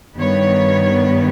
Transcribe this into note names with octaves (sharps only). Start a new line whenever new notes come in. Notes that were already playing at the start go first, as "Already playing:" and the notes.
G2 D#3 G3 B3 C#5